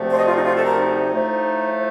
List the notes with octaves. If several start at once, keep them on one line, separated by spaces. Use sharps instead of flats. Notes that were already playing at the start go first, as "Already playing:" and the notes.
Already playing: D2 C3 F3 A3
C5
D#5
F4
D#4
F4
A4
A#4
D#4
A2 F3 A3